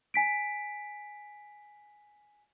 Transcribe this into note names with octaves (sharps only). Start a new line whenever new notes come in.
G#5 B6 D7